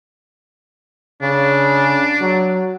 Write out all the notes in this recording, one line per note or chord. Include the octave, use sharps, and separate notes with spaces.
C#3 D4
F#3